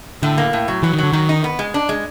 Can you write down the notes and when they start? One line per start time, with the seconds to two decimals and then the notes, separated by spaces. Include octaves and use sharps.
0.22 A2 D3
0.38 A#3
0.53 A2
0.68 F#3
0.83 E3 F#3
0.93 D#3
0.99 D3 F#3
1.13 D#3 F#3
1.29 D#4
1.44 B3
1.59 G#3
1.74 D4
1.89 G#3